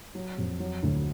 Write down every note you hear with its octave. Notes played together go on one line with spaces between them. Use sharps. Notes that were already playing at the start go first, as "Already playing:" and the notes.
F#3
F2
F#3
D2